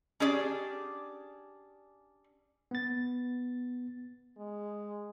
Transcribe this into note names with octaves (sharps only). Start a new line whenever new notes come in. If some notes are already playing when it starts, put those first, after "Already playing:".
C#4 D4 G4 G#4 D5
B3 A6
G#3